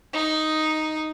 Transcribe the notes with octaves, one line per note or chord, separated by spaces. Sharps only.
D#4